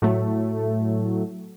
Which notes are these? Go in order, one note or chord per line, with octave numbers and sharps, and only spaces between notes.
A2 F#3 A3